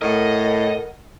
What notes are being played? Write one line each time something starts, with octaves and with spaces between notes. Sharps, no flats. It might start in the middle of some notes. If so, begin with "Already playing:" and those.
A2 A#4 D#5 F#5